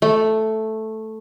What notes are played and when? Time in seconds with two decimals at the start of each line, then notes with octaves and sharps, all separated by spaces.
0.02 A3